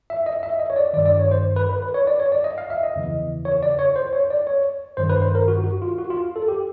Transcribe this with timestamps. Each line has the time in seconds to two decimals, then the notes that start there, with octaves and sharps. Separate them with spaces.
0.10 E5
0.26 D#5
0.43 E5
0.59 D#5
0.70 C#5
0.76 D5
0.93 D#3 D5
0.97 G2
1.06 D5
1.19 C#5
1.31 C5
1.56 B4
1.70 B4
1.82 B4
1.94 C#5
2.07 D5
2.20 C#5
2.32 D5
2.44 D#5
2.58 F5
2.70 E5
2.83 D#5
2.96 E2 C#3 E3
3.45 C#5
3.62 D5
3.79 C#5
3.96 C5
4.13 C#5
4.30 D5
4.47 C#5
4.97 G2 D#3 C5
5.09 B4
5.22 C5
5.35 A#4
5.48 F#4
5.64 F#4
5.82 F4
5.98 F#4
6.10 F4
6.36 A4
6.48 G4